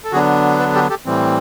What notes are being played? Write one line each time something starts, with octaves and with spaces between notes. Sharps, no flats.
A4
D3 F#3 B3 D4 F#4 G#4
A4 B4
G4 A4
G4 A4
A2 E3 G3 C4